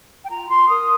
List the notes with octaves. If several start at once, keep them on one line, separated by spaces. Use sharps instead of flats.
G5
F4 A#5
F4 C6
A#4 D#6